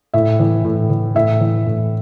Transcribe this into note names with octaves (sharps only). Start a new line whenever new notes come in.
A2 E5
E3
A2
E3
A2 E5
E3
A2